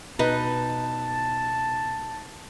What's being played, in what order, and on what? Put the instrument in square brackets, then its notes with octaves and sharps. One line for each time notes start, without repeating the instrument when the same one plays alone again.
[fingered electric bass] B2 [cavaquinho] D#4 [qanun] B4 [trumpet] A5